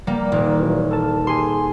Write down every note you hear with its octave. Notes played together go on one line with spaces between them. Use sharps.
G3 A#3
D#1
E3 F#3
A4 A#4 A5
G4 G#4 G#5 C6